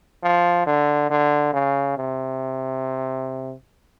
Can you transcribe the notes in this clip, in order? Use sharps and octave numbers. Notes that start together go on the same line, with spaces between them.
F3
D3
D3
C#3
C3